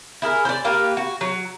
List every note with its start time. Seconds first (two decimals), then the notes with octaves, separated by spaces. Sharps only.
0.22 E4 G#4 A#4
0.45 C5 D5
0.65 A#3 G4 A#4 B4
0.97 F#4
1.21 F#3